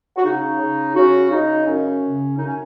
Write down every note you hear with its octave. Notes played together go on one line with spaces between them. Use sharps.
F#4
C#3 D#4
C#3
C#3 C#4 F#4
C#3 D#4
F#2 C#4
C#3
F#2 D#4
C#4